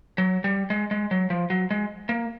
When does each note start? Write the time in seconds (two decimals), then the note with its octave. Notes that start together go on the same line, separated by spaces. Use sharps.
0.18 F#3
0.44 G3
0.70 G#3
0.91 G#3
1.11 F#3
1.30 F3
1.50 F#3
1.71 G#3
2.09 A#3